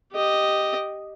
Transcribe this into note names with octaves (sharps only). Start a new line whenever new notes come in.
G4 D#5